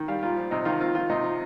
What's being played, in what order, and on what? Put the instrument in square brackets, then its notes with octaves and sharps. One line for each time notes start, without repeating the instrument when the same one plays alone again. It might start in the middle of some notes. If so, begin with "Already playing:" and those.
Already playing: [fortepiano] D#3
G3 F5
A#2 F4
F3
C3 D#4
D#3 F4
C4 F4
D#3 F4
C3 D#4
F3